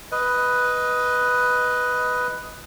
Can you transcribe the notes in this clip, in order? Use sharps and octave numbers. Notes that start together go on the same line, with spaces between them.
B4 D#5